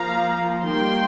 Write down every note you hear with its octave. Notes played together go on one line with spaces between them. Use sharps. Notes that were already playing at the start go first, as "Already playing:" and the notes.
Already playing: F3 A#3 F5 A#5
D#3 G3 A#3 G5 C6